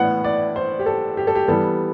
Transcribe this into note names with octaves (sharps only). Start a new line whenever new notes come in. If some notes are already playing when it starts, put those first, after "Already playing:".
Already playing: A2 E3 B3 F#5
D5
C5
G4
A4
G4
A4
G4
E3 G3 B3 A4